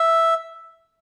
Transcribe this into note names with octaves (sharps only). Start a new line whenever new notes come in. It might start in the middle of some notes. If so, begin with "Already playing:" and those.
Already playing: E5